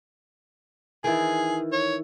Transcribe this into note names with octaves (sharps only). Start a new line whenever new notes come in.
D#3 E3 G#4
C#5